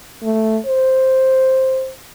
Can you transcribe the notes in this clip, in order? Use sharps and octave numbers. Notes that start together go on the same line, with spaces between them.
A3
C5